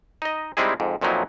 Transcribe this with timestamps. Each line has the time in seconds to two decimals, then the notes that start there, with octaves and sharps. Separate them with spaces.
0.22 D#4 D#5
0.57 G3 G#3 C4 D#4 E4 G#4
0.80 F2 G#2
1.01 F2 A#2 F3 F#3 D#4 E4